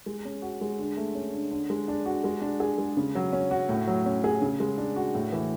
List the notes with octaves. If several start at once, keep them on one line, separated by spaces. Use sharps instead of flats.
G#3
C#4
F#4
G#3
D3
A3
C#4
D3
D3
G#3
D4
F#4
G#3
D4
G#4
G#3
C#3
F#3
C#4
F#4
A2
F#3
C#4
G#4
C#3
G#3
D4
F#4
A2
E3